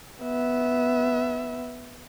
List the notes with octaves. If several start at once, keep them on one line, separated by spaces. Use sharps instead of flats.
B3 E5